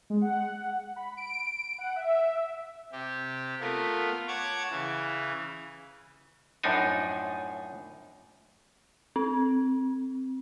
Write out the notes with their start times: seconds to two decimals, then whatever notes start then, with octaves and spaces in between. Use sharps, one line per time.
0.10 G#3
0.22 F#5
0.96 B5
1.17 D7
1.79 F#5
1.96 E5
2.92 C3 G4
3.60 A3 B3 F4 A#4
4.28 C#5 F#5 A5 D6 G#6
4.71 C#3 E3
6.63 F#2 A2 F3 D4 D#4 G#5
9.16 C4